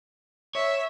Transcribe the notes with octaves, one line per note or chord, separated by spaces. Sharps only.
C#5 E5